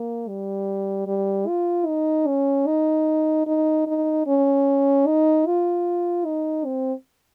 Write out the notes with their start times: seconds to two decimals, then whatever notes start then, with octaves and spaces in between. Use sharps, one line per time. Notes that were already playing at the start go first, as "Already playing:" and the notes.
Already playing: A#3
0.29 G3
1.07 G3
1.48 F4
1.87 D#4
2.27 C#4
2.67 D#4
3.47 D#4
3.87 D#4
4.27 C#4
5.07 D#4
5.47 F4
6.26 D#4
6.65 C4